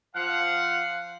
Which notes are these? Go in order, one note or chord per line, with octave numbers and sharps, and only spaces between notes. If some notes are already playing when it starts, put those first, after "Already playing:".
F3 F5 F#5